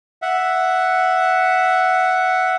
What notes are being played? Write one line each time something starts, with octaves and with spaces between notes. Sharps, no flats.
E5 F#5